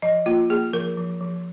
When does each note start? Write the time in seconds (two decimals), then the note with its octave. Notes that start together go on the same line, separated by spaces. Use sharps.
0.02 F3 D#5
0.26 A#3 F4
0.50 A#3 G#4
0.73 F3 A#4
0.97 F3
1.21 F3